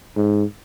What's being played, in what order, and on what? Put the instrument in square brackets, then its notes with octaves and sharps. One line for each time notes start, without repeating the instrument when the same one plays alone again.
[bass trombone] G#2